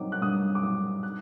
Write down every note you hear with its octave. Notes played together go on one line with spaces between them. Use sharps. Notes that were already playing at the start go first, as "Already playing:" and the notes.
Already playing: G2 F#3 C4 D#4 D6
F#6
G2 D#6
D6
F#3 C4 D#4 D#6
F#6